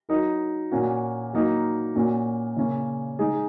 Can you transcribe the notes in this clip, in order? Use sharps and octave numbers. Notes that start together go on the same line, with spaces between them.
F#3 D#4 A#4
A#2 A#3 C#4 F#4
F#3 A#3 D#4
A#2 A#3 C#4 F#4
C#3 A#3 C#4
G#3 D#4 G#4